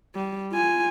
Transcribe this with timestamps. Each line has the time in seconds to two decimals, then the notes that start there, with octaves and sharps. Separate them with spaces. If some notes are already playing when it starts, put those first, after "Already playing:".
0.16 G3
0.52 F4 G#5